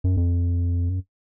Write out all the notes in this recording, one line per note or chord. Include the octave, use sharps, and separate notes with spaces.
F#2
F2
F#2